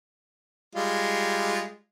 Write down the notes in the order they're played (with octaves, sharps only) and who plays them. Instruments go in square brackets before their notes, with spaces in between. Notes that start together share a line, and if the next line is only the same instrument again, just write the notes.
[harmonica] G3 G#3 F4